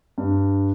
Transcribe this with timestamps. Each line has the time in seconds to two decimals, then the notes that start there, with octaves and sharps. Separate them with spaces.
0.18 G2